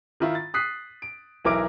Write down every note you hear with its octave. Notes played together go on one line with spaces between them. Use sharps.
D#3 E4 F4
A6
D#6 F#6 B6 C7
D7
B1 E3 A#4 E5 D6 D7